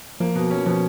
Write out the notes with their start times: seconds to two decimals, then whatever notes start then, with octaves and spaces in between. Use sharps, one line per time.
0.20 F3 A#3
0.35 B2
0.51 C#4
0.66 B2 F3